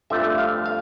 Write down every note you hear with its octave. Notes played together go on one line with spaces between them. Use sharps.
G1 F2 D3 F3 A3 E5
F5
F5